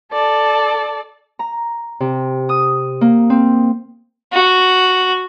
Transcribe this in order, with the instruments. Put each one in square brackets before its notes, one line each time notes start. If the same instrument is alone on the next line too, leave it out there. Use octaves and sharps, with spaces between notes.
[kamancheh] A4 D5
[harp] A#5
C3
D#6
A#3
C4
[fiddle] F#4